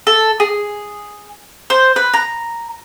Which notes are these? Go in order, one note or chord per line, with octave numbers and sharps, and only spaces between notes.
A4
G#4
C5
B4
A#5